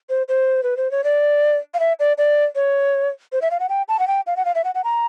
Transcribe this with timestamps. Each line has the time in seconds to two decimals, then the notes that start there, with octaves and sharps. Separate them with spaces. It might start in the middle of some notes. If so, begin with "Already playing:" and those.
0.09 C5
0.28 C5
0.63 B4
0.77 C5
0.91 C#5
1.04 D5
1.74 F5
1.80 E5
2.00 D5
2.18 D5
2.55 C#5
3.32 C5
3.42 E5
3.51 F5
3.60 F#5
3.69 G5
3.88 A5
3.99 F#5
4.08 G5
4.27 F5
4.37 F#5
4.45 F5
4.55 E5
4.64 F#5
4.75 F#5
4.84 A#5